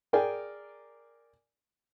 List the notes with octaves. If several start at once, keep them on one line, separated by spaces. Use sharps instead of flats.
G#4 A#4 D5 G5 G#5